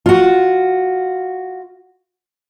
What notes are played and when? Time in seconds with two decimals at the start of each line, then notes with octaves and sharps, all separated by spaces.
0.06 F4 F#4